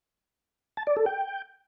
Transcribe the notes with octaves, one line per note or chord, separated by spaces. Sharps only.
A5
D5
A4
G5